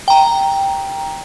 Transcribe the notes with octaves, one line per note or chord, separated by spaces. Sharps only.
G5 A#5